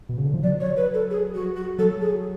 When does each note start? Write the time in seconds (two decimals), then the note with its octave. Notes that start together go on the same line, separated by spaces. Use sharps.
0.09 B2
0.17 C#3
0.26 D3
0.34 F3
0.42 F#3 D5
0.60 C#5
0.76 B4
0.93 A4
1.10 G#4
1.34 F#4
1.55 F#4
1.78 F#3 A4
2.01 G#4